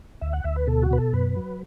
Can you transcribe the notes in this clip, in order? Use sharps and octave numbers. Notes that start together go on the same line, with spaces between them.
D2 E5
F#5
D2 E5
B4
B2 A4
F#4
B2 B4
A4
F#2 B4
F#3